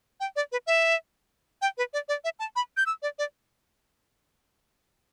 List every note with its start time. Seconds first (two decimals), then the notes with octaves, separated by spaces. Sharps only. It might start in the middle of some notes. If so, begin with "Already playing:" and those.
0.20 G5
0.36 D5
0.52 B4
0.67 E5
1.62 G5
1.78 B4
1.93 D5
2.09 D5
2.24 E5
2.39 A5
2.56 B5
2.77 G6
2.86 E6
3.02 D5
3.19 D5